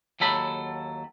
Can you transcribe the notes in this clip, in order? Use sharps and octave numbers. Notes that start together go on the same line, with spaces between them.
D#2 F#3 A4 B5